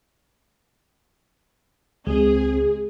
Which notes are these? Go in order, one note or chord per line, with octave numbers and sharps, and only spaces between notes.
C#2 G#3 C4 G#4